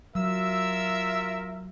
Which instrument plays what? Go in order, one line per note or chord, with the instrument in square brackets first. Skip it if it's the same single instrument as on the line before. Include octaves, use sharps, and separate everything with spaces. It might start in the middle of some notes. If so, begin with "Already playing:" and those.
[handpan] F#3 [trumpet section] F4 A#4 E5 [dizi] E6